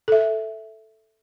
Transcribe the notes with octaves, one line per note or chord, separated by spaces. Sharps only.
A4 E5